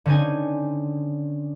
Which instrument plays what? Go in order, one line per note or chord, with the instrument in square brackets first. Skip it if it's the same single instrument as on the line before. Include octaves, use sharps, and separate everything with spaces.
[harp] D3 C4 C#4 D#4 G#5